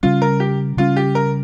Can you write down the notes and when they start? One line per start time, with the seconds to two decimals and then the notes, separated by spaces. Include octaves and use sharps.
0.03 C#3 G3 C#4 F4
0.22 A#4
0.40 G4
0.77 C#3 G3 C#4 F4
0.96 G4
1.15 A#4